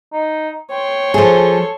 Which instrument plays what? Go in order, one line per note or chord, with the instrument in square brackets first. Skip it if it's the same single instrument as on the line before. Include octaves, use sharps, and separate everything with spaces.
[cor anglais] D#4
[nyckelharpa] C#5 C6 [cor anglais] G5
[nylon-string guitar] F3 G#4 [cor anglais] A4